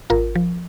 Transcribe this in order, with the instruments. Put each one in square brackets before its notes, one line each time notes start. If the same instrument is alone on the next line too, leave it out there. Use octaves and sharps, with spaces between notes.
[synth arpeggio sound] G#1 F4 A#4
F3